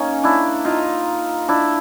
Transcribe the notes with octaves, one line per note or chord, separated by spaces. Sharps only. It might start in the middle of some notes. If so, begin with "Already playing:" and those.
Already playing: A#3 C#4 D#4
D4 E4
D#4 F4
D4 E4